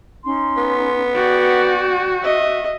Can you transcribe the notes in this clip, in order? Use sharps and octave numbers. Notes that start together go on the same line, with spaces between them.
C#4 D#4 C6
B3
F#4 D5 G5 G6
D#5 E5